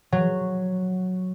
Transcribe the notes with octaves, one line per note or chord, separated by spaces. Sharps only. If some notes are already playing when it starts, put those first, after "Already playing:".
F#3